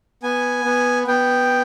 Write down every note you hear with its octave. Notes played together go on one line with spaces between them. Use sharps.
B3 G#5
B3
B3 G5